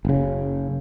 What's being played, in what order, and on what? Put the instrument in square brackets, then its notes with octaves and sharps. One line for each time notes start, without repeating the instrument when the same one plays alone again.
[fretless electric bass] F#1 C#3